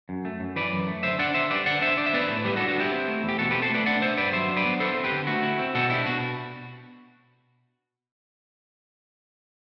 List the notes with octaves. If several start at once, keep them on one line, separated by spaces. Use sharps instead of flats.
F#2
A3
F#2
E3 B4 D5
F#2
A3
D3 C5 E5
D4 D5 F#5
D3 C5 E5
G3 B4 D5
D3 D5 F#5
D4 C5 E5
D4 D5
E5
B3 B4 D5
A2
G3 G4 B4
F#4 A4
D4
F#4
B3 E4 G4
C4
A3
E2 G4
B2 F#4 A4
G4 B4
C4
A4 C5
A3 B4 D5
D4 D5 F#5
B3 C5 E5
G2 B4 D5
F#3 C5 E5
D4
B4 D5
B3
E4 A4 C5
C4
G4 B4
D3
A3 F#4
E4
C4
B2 F#4 A4
D4 E4 G4
B2 F#4